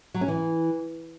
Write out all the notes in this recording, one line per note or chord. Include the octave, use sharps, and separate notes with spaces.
F#3
C#4
E3